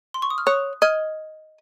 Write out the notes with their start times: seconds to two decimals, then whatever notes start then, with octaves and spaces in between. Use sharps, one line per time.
0.14 C6
0.22 C#6
0.30 D#6
0.38 F6
0.47 C#5 D#6 F#6
0.82 D#5 F6 G#6